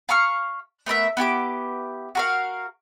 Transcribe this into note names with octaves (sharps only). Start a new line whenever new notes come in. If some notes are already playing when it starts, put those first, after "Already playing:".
F5 A#5 C#6 F6
A3 B3 A#4 E5
B3 E4 G4 D6
F#4 A#4 F5